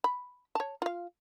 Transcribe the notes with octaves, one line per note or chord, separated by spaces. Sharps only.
B5
C#5 A5
F4 F5